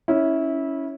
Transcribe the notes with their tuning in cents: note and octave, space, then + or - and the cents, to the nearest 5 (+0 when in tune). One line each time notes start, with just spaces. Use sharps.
C#4 +0 E4 -20